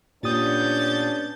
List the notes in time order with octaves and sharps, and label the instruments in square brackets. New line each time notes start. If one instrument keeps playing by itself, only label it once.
[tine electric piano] A#2 G4 D#6 [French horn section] B3 C#4 D4 [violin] G6 A6